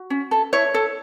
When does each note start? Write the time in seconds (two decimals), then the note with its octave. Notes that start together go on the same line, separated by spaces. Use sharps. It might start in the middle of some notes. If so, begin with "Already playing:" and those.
Already playing: F#4
0.10 C#4
0.31 A4
0.53 E4 C#5
0.74 A4